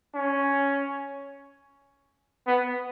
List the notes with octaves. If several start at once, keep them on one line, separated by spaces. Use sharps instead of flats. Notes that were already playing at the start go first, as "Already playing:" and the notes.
C#4
B3